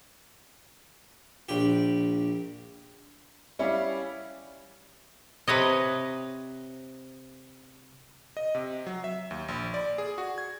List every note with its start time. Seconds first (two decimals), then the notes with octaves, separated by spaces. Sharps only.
1.49 A#1 G4
3.59 G3 C#4 E4 D5 E5 F5
5.48 C3 B4 C#5 D#5
8.37 D#5
8.55 C3
8.87 F#3
9.04 E5
9.31 D#2
9.48 A#1
9.74 D5
9.98 G#4
10.18 F#4
10.38 G#6